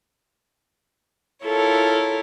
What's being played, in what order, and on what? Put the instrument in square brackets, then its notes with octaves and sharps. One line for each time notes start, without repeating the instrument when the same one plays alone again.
[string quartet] E4 F4 A4 A#4 C#5